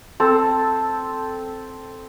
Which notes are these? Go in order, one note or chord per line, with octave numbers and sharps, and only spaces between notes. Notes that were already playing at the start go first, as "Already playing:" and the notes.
C4 A4